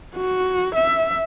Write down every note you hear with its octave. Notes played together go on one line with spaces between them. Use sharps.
F#4
E5